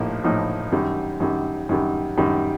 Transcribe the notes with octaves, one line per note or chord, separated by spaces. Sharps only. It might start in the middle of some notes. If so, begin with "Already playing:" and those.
Already playing: A#1 A2 F3 A#3 D#4
A#1 A2 F3 A#3 D#4
F#2 D#3 G3
F#2 D#3 G3
F#2 D#3 G3
F#2 D#3 G3